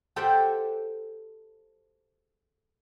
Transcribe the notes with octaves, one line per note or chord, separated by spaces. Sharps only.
G4 A4 C5 E5 F#5 G5